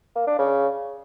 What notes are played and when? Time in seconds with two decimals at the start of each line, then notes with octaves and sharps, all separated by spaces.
0.16 A#3
0.27 D4
0.39 C#3